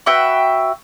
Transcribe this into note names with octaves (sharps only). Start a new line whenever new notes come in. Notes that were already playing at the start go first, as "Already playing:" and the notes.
F#4 B4 E5 G5